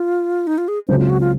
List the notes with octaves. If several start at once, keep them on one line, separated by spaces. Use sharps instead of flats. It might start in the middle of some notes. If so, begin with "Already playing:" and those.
Already playing: F4
D#4
F4
G#4
C#2 C#3 F#3 C4 C5
F4
F#4
F4